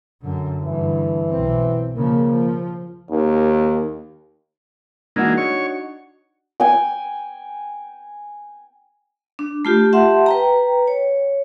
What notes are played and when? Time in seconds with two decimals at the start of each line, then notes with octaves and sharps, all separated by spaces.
0.22 F#2 D3
0.64 G2 D3 E3
1.30 B1 C4
1.96 C#3 F3 A#3
2.26 F3
3.11 D#2
5.16 E3 G#3 A#3 D4 D#4 F#4
5.38 C#5 C#6
6.60 G5 G#5
9.39 D4
9.65 A3 F4 G4
9.93 G4 E5 F#5 A5 C6
10.26 B4 G5 A#5
10.87 C#5